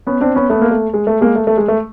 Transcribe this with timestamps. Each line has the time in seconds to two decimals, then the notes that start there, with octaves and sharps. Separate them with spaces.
0.07 B3 C#4
0.21 C4 D4
0.35 B3 C#4
0.50 A3 B3
0.62 A#3
0.71 A3
0.94 G#3
1.07 A3
1.21 G#3 A#3
1.36 A3
1.47 A3
1.57 G#3
1.68 A3